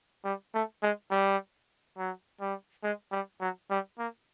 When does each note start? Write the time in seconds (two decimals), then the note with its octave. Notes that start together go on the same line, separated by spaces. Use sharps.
0.24 G3
0.54 A3
0.82 G#3
1.11 G3
1.98 F#3
2.41 G3
2.83 G#3
3.12 G3
3.40 F#3
3.70 G3
3.98 A#3